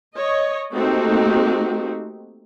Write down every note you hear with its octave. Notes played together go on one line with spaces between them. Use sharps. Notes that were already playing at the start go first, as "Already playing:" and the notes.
C#5 D#5
A3 A#3 C4 D#4 F#4 G4